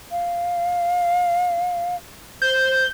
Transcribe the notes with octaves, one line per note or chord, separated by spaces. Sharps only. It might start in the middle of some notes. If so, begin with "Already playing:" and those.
F5
C5 G6